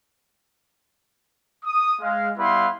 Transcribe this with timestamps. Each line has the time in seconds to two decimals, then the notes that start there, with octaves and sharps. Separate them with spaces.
1.65 D#6
2.01 G#3 F5
2.38 G3 B3 E4 B4 F5 C6